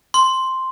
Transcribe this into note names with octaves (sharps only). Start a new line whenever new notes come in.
C6